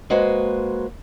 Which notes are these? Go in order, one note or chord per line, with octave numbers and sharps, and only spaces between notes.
G#3 A#3 F#4 B4 C5